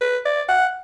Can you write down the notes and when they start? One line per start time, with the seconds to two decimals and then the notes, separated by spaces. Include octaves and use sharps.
0.01 B4
0.25 D5
0.49 F#5